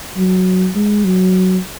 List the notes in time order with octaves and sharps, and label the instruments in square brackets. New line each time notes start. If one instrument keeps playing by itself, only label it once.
[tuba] F#3
G#3
F#3